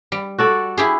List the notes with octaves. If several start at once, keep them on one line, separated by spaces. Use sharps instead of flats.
G3
F#4 A4 D5
E4 G4 G#4